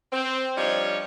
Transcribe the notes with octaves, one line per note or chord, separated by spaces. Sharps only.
C4
F3 G3 D4 D#4 C#5